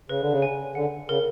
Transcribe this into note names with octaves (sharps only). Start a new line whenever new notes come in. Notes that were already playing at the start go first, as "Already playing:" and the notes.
C#3 B4
D3
C#3
G#5
D3 F#5
C#3 A#4